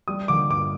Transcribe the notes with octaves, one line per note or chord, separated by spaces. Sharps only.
G3 D#6
D3 D6
G2 D6